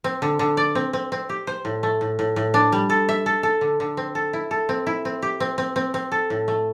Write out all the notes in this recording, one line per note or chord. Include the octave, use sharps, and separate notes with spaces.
C4
D3
D3
D5
C4
C4
C4
G4
C5
A2
A3
A2
A2
A2
D4
G3
A4
E5
A4
A4
D3
D3
C4
A4
E4
A4
C4
E4
C4
G4
C4
C4
C4
C4
A4
A2
A3